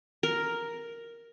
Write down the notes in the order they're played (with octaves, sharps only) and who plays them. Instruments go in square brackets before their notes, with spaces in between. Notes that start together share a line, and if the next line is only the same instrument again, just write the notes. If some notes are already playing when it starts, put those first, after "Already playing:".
[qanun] A#4